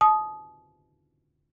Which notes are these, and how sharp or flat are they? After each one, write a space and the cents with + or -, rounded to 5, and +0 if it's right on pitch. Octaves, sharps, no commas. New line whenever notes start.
A5 -40 D#6 +0